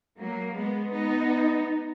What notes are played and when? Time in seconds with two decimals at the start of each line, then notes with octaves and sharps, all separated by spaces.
0.17 F#3 A#3
0.55 G#3 B3
0.92 B3 D#4